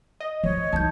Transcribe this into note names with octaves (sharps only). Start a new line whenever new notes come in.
D#5
F3 C#5
E3 D#4 A5 G6